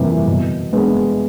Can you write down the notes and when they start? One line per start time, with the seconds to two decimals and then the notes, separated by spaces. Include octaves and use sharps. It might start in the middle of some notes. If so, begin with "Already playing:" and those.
Already playing: F2 C3 E3 G3 A#3
0.27 B2
0.73 G#3 B3 D4